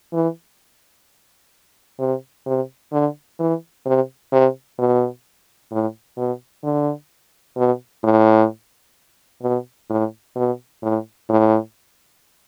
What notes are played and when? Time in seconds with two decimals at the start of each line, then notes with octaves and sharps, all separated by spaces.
0.13 E3
1.99 C3
2.46 C3
2.92 D3
3.39 E3
3.86 C3
4.32 C3
4.78 B2
5.72 A2
6.17 B2
6.64 D3
7.57 B2
8.04 A2
9.42 B2
9.90 A2
10.36 B2
10.82 A2
11.29 A2